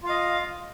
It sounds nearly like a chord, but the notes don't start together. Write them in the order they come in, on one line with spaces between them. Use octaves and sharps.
F4 F5 D#5